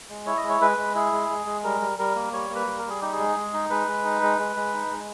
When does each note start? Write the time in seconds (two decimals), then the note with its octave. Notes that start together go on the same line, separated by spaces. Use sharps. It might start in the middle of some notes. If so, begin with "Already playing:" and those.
0.09 G#3
0.26 E4 C#5
0.37 D#5
0.43 G#3
0.49 C#5
0.61 G#3 B4
0.77 G#3
0.95 E4 G#4
1.12 G#3
1.29 G#3
1.46 G#3
1.64 G3 A#4
1.81 G3
1.99 G3 A#4
2.15 A#3
2.33 G3 C#5
2.50 A#3
2.55 B4
2.67 G3
2.78 A#4
2.85 G3 G#4
3.01 D#4 G4
3.12 G#4
3.19 G#3
3.37 G#3
3.54 D#4
3.70 G#3 B4
3.87 G#3
4.04 D#4
4.22 G#3
4.39 G#3
4.56 G#3
4.74 D#4
4.91 G#3